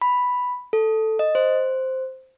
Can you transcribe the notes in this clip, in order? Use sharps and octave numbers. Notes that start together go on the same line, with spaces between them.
B5
A4
D#5
C5